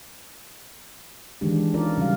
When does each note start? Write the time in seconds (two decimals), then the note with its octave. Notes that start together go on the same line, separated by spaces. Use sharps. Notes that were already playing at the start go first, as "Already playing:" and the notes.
1.41 D#3 E3 G#3 D4 G4
1.74 C#4 D#4 F4 A#4 D5
1.98 C#3 G3 F#4 F5